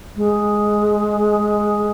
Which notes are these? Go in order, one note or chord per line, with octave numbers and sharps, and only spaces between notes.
G#3